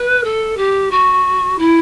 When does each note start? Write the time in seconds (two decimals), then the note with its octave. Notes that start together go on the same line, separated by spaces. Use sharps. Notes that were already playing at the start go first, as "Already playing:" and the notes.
Already playing: B4
0.23 A4
0.56 G4
0.90 F#4
1.58 E4